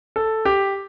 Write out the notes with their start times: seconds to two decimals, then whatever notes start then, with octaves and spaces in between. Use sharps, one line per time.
0.16 A4
0.45 G4